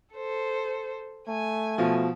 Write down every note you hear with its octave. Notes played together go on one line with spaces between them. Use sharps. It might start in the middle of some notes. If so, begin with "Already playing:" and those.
A4 C5
A3 G#5
B2 F3